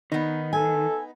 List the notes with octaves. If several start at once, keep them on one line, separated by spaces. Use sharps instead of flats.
D#3 B3 D#4
A4 G#5